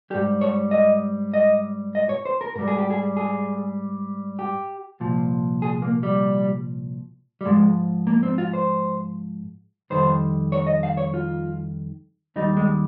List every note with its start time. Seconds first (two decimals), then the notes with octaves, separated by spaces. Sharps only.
0.10 G3 G4
0.15 G#2
0.41 C#5
0.71 D#5
1.34 D#5
1.95 D#5
2.09 C#5
2.25 C5
2.41 A#4
2.55 G#2 G3 A#4
2.68 G#4
2.78 G4
2.90 G#4
3.17 G#4
4.39 G4
5.00 C2 A#2 F3
5.62 G#4
5.82 A#3
6.03 G3
7.41 G3
7.45 G#2 F3 G#3
8.07 A#3
8.23 C4
8.38 F4
8.53 C5
9.90 F2 D#3 G3 C5
10.52 C#5
10.67 D#5
10.83 F5
10.97 C#5
11.14 F4
12.36 D#2 D#3 G3 D#4
12.57 G#3